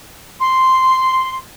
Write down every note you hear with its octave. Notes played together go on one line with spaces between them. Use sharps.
C6